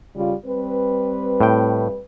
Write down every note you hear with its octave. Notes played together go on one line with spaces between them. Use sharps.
C#3 G3 F4
G3 C4 B4
A2 G5